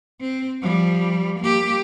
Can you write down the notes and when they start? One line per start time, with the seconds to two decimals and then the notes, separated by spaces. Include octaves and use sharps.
0.21 C4
0.62 F3 G3
1.40 A#3 G4